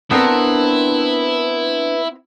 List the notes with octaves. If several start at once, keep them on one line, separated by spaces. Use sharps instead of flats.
B3 C4 D4 E4 A#4 B4 F#5 A5